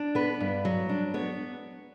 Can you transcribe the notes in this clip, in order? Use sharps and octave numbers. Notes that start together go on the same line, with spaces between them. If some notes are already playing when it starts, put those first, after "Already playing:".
Already playing: D4
B3 B4
G2
F#3
D4
B3 C#5